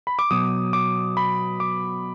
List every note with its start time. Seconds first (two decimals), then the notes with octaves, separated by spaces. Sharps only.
0.07 B5
0.19 D6
0.31 B2 F#3 D#6
0.73 D6
1.17 B5
1.60 D6